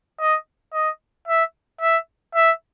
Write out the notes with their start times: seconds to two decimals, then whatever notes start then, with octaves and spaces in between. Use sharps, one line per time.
0.20 D#5
0.73 D#5
1.28 E5
1.81 E5
2.35 E5